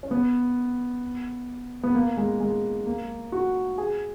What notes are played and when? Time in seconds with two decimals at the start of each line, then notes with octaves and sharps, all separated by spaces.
0.03 C#4
0.11 B3
1.83 B3
1.95 A#3
2.17 G#3
2.40 G#3
2.86 A#3
3.32 F#4
3.78 G#4